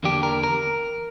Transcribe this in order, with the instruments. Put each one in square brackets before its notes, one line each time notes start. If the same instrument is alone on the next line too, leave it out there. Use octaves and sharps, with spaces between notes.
[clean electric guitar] E2 D3 A#3 D4 G4
A#4
A#4